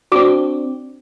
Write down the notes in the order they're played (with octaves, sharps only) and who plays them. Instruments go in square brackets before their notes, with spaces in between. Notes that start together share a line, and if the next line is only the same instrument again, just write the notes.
[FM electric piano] C4 D4 [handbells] F#4 D6